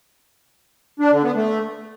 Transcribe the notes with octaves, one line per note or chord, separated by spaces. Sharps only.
D4
D3
B3
A3